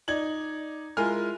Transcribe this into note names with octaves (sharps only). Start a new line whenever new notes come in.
D#4 D5 G#6 F#7
G#3 E4 F4 A#4 G#5 F6